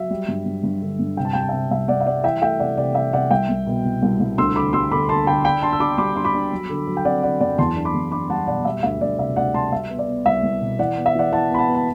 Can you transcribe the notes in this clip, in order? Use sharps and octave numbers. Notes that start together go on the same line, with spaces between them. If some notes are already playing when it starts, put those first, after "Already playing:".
Already playing: F#3 E5
G3
G2
G2
G2
D3
G2
C3 G5
A5
G3 G5
A5
C3 E5 G5
C2 E5
C2 D5 F#5
E5
G3 D5 F#5
E3 E5 G5
A3 E5 G5
C3 D5 F#5
C3 D5
E3 E5
C3 D5 F#5
C2 E5 G5
C2
B2
C2
C2
C2
D2 C6 E6
D3 B5 D6
G3 C6 E6
D3 B5 D6
D3 A5 C6
D3 G5 B5
D4 G5 B5
D4 A5 C6
E6
D4 B5 D6
G3 B5 D6
D4 C6
B5 D6
D4
F#3
D3
F#3
G5
C4 D5 F#5
D3 D5 F#5
F#2 D5 F#5
E2 A5 C6
D4
B5 D6
E2
D4 B5 D6
G3 F#5 A5
B2 D5 F#5
G3 E5
D2 E5
D2 D5
C3 E5
D2 D5 F#5
G3 A5 C6
G3 E5
B3
D5
B3
C2 E5
C2
B2
E3 D5 F#5
B3
E5
E3 D5 F#5
E3 F#5 A5
B3 B5
F#5 A5
B3
A5